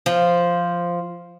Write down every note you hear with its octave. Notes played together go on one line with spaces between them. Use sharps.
F3